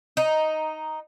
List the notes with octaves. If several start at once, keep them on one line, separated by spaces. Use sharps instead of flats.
D#4